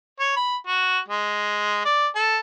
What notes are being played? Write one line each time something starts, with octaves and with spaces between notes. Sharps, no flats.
C#5
B5
F#4
G#3
D5
A4